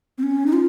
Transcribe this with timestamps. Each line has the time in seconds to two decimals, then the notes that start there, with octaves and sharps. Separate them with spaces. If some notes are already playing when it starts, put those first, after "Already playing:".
0.18 C4
0.23 C#4
0.46 D#4
0.53 F4